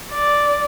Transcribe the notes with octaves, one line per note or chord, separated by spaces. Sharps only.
D5